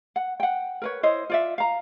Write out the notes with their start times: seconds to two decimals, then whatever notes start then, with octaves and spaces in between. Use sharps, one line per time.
0.16 F#5
0.40 F#5 G5
0.82 A#4 B4 C#5
1.03 E4 C5 C#5 D#5
1.30 F4 D5 E5
1.58 F5 A#5